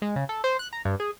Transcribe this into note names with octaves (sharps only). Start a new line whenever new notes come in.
G#3
C#3
A4
C5
F#6
A#5
G2
G#4